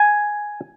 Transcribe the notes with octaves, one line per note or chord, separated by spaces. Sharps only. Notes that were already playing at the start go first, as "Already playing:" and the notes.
Already playing: G#5